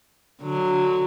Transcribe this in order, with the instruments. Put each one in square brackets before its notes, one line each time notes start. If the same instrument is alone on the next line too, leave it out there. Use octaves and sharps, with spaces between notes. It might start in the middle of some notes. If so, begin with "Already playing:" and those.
[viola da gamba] D3 F#3